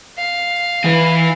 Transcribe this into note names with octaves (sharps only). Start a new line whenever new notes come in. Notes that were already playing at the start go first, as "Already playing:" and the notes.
F5
E3 B4